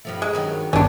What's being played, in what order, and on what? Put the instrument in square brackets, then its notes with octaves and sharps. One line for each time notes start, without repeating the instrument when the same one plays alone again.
[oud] G2 F3 A3
[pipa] G#3
[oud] G2 D#3 F#3
[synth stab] G1 G2 D#3 [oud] B3 D5 [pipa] C#4 D4